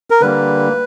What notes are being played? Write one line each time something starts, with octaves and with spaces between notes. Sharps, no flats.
A#4
D3 G3 A#3 B4